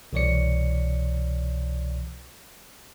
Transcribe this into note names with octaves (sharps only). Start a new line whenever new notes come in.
C2 B2 E3 C#5 D5 C#7